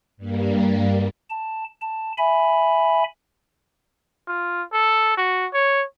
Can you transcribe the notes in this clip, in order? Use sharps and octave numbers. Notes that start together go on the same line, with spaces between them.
G2 G3 A#3
A5
A5
E5 G#5 B5
F4
A4
F#4
C#5